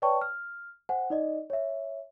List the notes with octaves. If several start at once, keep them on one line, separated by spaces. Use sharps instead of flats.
B4 C#5 D5 G5 A5 C#6
F6
C5 F#5 G#5
D#4 D5 D#5
C#5 E5